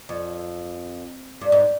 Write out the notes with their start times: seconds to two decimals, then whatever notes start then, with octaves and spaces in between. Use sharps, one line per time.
0.09 F2
1.41 G2
1.52 G#2